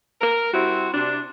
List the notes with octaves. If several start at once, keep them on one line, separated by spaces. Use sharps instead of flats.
A#4
G3 C4 E4 F#4
C3 D4